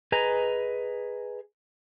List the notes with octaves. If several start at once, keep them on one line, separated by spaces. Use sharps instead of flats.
G#4 B4 D#5 G#5 A#5